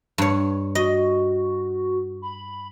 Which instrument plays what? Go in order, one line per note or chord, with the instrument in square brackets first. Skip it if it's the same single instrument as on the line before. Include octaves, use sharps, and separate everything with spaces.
[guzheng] G2 C#5
[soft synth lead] F#4 [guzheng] D#5
[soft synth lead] B5